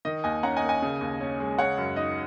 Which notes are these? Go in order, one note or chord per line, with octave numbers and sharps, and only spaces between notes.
D#3 D#5
D#2 D#5 G#5
C#4 F#5 A#5
D#5 G#5
A#3
D#5 G#5
C#3
D#2
C#4
G#3
C#3 C#5 F#5
F#2
D#4 D#5